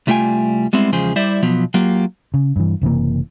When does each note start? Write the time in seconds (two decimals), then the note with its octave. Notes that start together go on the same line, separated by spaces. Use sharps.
0.07 C2 G3 A3 F4 G5 G#5
0.73 G3 G#3 B3 C4 E4
0.92 E2 C#3 F3 G#3 G#4 C5
1.16 G3 E4 G4 C5 D5 E5
1.43 B2 F3 F#3 B3
1.74 F#3 A#3 F4 G4
2.34 C#3
2.56 G2 E3
2.81 F#1 C3 E3 A#3